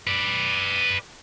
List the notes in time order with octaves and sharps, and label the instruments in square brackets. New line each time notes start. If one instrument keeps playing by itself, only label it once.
[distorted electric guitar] B4 D5